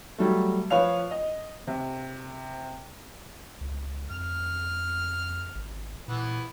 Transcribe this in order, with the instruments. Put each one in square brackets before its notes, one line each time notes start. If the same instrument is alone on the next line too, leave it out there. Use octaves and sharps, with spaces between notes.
[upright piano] F#3 G3 A3
F3 B4 C#5 F5 F7
D#5
C3
[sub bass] C#2
[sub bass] F2 [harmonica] F6
[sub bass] G#1
[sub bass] A#2 [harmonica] E3 B3